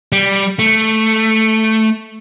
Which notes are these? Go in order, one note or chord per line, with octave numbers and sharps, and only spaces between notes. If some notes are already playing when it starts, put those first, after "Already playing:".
G3
A3